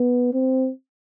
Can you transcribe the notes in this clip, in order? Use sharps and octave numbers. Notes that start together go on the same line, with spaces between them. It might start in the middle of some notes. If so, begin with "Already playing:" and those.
Already playing: B3
C4